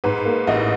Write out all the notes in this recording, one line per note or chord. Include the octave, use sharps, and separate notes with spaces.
G#2 B4
A#3
A1 D#5